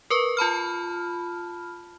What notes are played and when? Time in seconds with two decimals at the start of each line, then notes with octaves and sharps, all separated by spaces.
0.10 A#4 B4 C#6
0.37 F4 A5 B5 F6